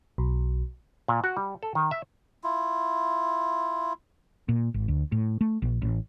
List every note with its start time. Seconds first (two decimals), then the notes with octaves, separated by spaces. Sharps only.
0.18 B1
1.08 A#2
1.24 F#4
1.37 G3
1.63 A4
1.75 D#3
1.91 E5
2.44 E4 F4
4.49 A#2
4.74 G#1
4.88 D2
5.12 A2
5.41 A3
5.62 A#1
5.82 A1